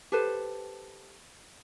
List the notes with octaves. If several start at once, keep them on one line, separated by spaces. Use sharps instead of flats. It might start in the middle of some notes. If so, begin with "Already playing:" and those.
G4 A4 B4 C5